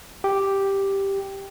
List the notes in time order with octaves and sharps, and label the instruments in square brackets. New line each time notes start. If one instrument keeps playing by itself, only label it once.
[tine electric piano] G4